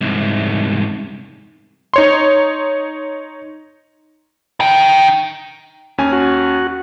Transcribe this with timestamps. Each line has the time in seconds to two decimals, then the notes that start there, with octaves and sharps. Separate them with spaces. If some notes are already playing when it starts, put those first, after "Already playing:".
0.01 C2 G#2
1.94 D#4 C#5 C6
4.60 D#4 G5
5.98 D#2 C#4 G#5
6.13 F#4